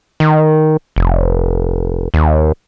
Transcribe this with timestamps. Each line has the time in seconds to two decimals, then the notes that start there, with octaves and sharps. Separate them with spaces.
0.20 D#3
0.96 F1
2.14 D#2